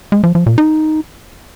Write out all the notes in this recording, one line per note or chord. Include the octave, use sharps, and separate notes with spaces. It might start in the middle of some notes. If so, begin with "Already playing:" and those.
G#3
F3
F3
A#2
D#4